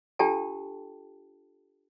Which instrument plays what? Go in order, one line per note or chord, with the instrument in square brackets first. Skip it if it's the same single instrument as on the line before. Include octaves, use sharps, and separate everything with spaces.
[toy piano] D4 F4 G4 A4 G5 A5